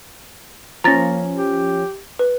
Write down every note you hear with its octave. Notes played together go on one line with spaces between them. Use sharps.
F3 A#3 C#4 A#5 A6 A#6
G4
B4